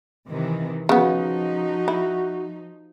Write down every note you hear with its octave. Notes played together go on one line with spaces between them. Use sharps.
C3 D#3 E3
C#3 F3 B3 D#4 F#4
E4